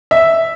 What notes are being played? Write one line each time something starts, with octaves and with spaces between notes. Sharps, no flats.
E5